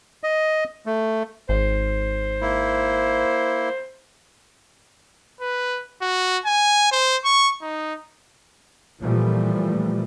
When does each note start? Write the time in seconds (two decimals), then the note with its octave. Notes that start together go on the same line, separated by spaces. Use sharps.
0.24 D#5
0.86 A3
1.49 G#1 C5
2.41 A#3 E4
5.41 B4
6.01 F#4
6.45 G#5
6.92 C5
7.25 C#6
7.62 D#4
9.02 A#2 E3 F3 G3 A3